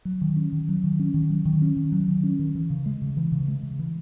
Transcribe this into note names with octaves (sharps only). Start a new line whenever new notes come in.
F#3
D#3
C#4
D#3
F#3
D#3
C#4
D#3
F#3
D#3
C#4
D#3
F#3
D#3
C#4
D#3
E3
C#3
G#3
C#3
E3
C#3
G#3
C#3
E3